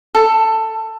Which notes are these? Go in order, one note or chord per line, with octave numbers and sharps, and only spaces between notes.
A4